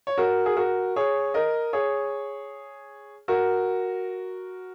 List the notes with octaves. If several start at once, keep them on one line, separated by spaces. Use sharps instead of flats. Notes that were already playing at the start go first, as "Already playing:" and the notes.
C#5
F#4 A#4
G#4
F#4 A#4
G#4 C#5
A#4 D#5
G#4 C#5
F#4 A#4